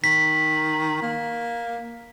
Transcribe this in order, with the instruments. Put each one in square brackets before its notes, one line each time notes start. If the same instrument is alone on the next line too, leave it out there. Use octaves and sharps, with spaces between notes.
[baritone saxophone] D#3 [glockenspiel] B6
[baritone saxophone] A#3